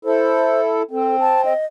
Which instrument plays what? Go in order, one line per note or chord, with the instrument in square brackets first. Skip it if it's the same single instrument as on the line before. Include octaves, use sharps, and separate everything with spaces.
[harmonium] E4 A4 [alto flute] C5
[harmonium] C4 [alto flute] A4
[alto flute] A5
D#5